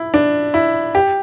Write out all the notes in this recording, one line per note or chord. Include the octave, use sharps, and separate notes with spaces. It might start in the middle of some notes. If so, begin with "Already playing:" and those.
Already playing: E4
D4
E4
G4